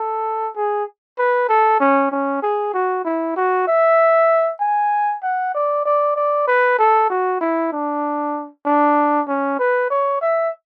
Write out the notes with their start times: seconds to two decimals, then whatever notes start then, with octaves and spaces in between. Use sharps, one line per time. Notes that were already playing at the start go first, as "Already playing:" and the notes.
Already playing: A4
0.56 G#4
1.18 B4
1.49 A4
1.80 C#4
2.12 C#4
2.42 G#4
2.74 F#4
3.05 E4
3.36 F#4
3.67 E5
4.60 G#5
5.23 F#5
5.55 D5
5.85 D5
6.16 D5
6.47 B4
6.79 A4
7.10 F#4
7.41 E4
7.72 D4
8.66 D4
9.28 C#4
9.59 B4
9.90 C#5
10.21 E5